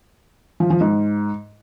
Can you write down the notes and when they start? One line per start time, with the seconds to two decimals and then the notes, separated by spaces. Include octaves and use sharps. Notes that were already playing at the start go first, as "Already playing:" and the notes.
0.60 F3
0.70 F3
0.81 G#2